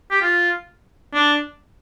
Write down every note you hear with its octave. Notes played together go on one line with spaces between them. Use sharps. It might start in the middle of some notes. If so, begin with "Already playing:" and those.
G4
F4
D4